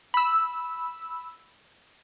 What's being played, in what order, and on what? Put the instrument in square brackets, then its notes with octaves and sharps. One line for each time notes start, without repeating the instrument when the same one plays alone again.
[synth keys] B5 E6